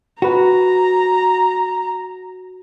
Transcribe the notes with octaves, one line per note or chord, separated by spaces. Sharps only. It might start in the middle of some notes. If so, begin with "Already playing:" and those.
F#4 B4 A#5